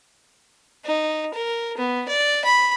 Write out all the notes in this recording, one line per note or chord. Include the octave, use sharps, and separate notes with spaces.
D#4
A#4
B3
D5
B5